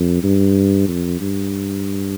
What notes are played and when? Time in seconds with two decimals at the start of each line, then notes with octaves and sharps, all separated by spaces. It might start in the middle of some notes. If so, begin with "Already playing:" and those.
Already playing: F2
0.23 G2
0.88 F2
1.21 G2